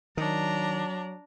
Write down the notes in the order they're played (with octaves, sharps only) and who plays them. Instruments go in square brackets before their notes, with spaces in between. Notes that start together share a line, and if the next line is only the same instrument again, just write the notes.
[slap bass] D#3 [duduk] F#3 [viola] D4 A#5